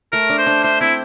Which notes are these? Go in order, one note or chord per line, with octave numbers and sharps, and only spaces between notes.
A3 A#4
D4
C5
D4
C5 E5
C4 E4